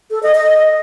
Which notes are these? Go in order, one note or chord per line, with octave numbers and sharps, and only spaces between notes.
A4
D#5
D#5